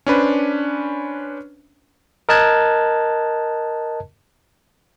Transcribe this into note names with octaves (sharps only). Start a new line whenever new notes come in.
C#4 D4 B4 C5
A#4 D#5 A5 F#6 G#6